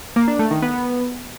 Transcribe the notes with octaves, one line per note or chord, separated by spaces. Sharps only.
A#3
D4
A3
D#3
B3